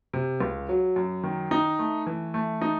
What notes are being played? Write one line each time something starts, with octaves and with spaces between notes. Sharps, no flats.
C3
C#2
F#3
F#2
D#3
D#4
A3
E3
A3
D#4